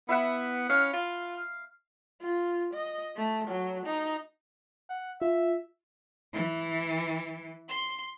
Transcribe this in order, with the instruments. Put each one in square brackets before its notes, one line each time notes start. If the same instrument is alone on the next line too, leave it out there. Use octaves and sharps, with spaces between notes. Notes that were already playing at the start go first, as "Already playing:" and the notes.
[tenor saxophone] B3 [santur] E4 E5 F#5
[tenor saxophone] C#4 [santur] F5
[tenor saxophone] F4
[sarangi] F4
D#5
A3
F#3
D#4
[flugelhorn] F#5
[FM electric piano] F4 [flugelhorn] E5
[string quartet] E3
C6